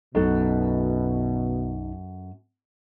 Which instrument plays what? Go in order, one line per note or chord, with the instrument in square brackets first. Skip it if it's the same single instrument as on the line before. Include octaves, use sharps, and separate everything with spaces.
[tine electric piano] B1 D#4 [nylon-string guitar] F#2 A4 F#5 [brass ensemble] B2